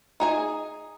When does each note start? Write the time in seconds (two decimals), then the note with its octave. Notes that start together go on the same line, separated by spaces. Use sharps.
0.20 D#4 G#4 G#5